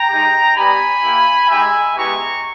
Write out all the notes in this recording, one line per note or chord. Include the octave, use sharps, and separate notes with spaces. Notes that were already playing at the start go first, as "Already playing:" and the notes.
Already playing: G5 A#5
G#3 D#4 G4
G3 B3 G4 G#5 B5
A#3 E4 G4
G#3 D#4 G4 E5 G#5
G#3 B3 E4 G4 A#5 C#6